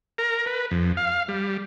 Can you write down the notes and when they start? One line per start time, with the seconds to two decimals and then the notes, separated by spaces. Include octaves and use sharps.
0.18 A#4
0.46 B4
0.71 F2
0.97 F5
1.28 G3